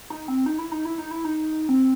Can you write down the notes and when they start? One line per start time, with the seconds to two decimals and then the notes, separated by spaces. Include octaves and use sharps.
0.10 D#4
0.28 C4
0.46 D#4
0.58 E4
0.72 D#4
0.85 E4
0.98 D#4
1.11 E4
1.25 D#4
1.69 C4